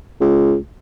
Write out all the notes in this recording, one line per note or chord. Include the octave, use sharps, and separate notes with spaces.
C#2